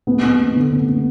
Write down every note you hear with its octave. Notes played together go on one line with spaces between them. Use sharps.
B3
B3
B3
D3
B3
B3